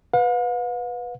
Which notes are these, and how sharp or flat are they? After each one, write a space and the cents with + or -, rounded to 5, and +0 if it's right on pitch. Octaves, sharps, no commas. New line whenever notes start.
B4 +0 F5 +45